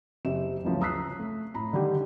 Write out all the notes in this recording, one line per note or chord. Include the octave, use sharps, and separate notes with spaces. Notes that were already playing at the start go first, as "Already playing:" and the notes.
F#1 G4 E5 E7
G1 D2 C#3 F3 F#3
A#5 D#6 E6 F#6 B6 C7
A3
A2 A#5 B5
D3 D#3 G3 D#4 G4